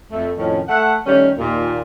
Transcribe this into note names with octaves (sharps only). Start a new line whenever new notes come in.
F2 A3
F2 A2 D#3 C#4
A3 F#5
D#3 G3 A3 C#4
D#2 A#2